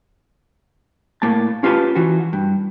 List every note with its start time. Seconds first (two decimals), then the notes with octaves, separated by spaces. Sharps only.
1.22 A2 A#3 A5
1.63 C#4 F4 G4 B4 A5
1.95 E3 F#4
2.33 G2